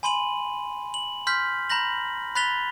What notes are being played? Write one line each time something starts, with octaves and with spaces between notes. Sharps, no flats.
G#5 B5 C6 D#7 F#7
F#7
C6 F6 G6 B6
A#5 B5 G6 A#6 F#7
B5 F#6 A6 B6 F7 G7